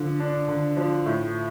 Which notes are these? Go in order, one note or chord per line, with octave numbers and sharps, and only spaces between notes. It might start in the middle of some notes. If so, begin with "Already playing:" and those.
Already playing: D3 F3
D4
D3
F3
A2